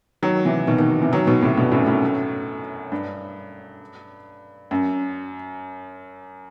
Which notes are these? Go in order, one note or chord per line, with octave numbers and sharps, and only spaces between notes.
D#3 F#3
C3 E3
B2 D#3
B2 D#3
C3 E3
D#3 F#3
B2 D#3
A2 C3
G2 B2
F#2 A2
F#2 A2
G2
F#2